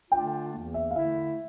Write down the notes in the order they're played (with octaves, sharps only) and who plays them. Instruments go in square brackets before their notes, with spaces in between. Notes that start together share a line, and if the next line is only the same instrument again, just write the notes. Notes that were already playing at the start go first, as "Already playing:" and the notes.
[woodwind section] D3 A3 D4 F4 [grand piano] G5
[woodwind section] E2 E3 A#3
[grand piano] E5
F5
[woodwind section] D3 A3 E4 [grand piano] E5